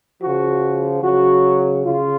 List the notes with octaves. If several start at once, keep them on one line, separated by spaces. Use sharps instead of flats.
C#3 F3 F#4
C#3 F#3 F#4
C#3 F4